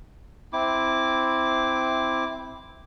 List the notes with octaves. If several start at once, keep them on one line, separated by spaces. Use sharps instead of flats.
C4 E4 D6